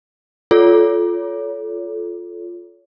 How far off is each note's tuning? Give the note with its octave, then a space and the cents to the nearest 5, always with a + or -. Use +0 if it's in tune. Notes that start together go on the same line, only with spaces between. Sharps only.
F4 +0 A4 -20 C#5 +30